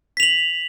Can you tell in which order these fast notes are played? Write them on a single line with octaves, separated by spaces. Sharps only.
B6 F7 F#7